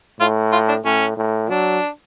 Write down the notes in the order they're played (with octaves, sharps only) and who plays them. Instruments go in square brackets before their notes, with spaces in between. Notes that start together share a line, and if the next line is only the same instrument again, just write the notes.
[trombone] A2 [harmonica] F4
[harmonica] F4
D4
[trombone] A2 [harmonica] C#4
[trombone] A2
[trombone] F#3 [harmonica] D4